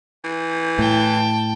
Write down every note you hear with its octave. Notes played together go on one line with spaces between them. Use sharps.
E3
A2 G5 A5